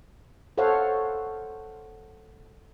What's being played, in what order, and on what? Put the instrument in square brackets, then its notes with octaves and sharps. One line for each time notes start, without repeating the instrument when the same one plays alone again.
[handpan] A4 C5 C#5 F5 F#5